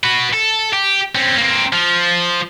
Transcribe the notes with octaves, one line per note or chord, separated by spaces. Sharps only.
F#4 B4
A4
G4
C4 C#4
A#3 C4
F3